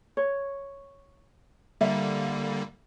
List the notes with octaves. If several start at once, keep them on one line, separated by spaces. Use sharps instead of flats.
C#5
D3 G3 A#3 E5